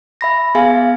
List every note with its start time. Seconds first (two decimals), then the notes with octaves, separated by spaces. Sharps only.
0.21 E5 B5 A#6
0.55 B3 G#4 E5 F5 G#5